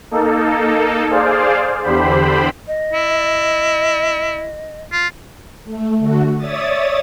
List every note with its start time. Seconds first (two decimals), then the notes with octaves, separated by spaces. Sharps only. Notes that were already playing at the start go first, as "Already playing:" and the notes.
0.11 A#3 D#4 A4
1.10 G#4 C5 D5 F5
1.83 E2 D3 G4 C5 B5
2.68 D#5
2.93 E4
4.92 F4
5.65 A3
5.99 D3 A3 F#4
6.37 C#5 D5 E5 D#6 A6